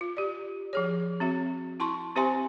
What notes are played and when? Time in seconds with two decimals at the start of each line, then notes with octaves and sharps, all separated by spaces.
0.01 F4
0.17 G4 D5
0.73 F3 G#4 C#5
1.20 C4 F#4 E5
1.80 E4 A5 C6 C#6
2.16 C4 G4 C5 E5 G#5 C6